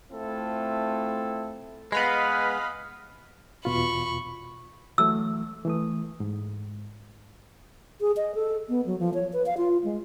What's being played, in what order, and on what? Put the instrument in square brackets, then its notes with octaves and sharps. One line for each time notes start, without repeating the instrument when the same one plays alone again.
[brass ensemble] A3 C4 E4 F4 A4
[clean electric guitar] G#3 B3 [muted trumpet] B4 [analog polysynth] D#5 F5 B5
[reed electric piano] E2 B2 F4 [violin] B5 C#6
[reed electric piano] E3 F#3 A3 [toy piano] E6
[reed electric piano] E3 A3 D#6
G#2
[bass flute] G#4
D#5
A4
B3
F#3
F3
C#5
B4
F5
F4
G#3